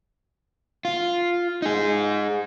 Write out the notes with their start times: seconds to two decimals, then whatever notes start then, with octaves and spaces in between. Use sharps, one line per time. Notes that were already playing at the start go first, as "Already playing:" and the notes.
0.85 F4
1.62 D#4 G#4